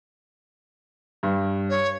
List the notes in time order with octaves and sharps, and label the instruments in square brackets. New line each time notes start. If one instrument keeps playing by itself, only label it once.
[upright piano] G2
[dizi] C#5